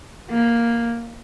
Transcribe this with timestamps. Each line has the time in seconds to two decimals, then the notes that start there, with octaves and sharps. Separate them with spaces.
0.30 A#3